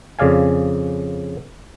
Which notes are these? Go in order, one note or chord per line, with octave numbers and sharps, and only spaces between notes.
F2 C#3 D5 F5 G#5